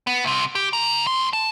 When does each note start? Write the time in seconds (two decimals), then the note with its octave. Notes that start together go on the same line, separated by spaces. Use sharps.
0.07 B3
0.24 C2 C3
0.55 G4
0.73 C#3 A#5
1.07 A2 C6
1.33 A5